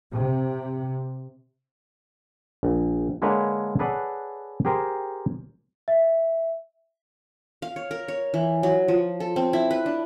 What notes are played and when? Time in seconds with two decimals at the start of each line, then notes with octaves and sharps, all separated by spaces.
0.15 C3
2.63 A#1
3.22 D3 G#3 A#3 B4 C#5
3.79 G#4 A4 B4 C#5 D5 F#5
4.65 G4 G#4 A#4 C5 G5
5.88 E5
7.62 F5
7.76 C#5
7.91 A#4
8.08 C#5
8.34 E3
8.63 F#3
8.88 F3
9.20 A4
9.36 C4
9.53 E4
9.71 B4
9.86 D4